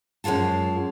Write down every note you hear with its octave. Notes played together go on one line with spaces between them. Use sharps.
F#2 A#2 G#3 F4 A5